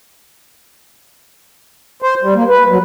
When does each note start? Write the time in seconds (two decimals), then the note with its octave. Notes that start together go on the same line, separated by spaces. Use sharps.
2.02 C5
2.22 G3
2.35 A#3
2.49 B4
2.69 F#3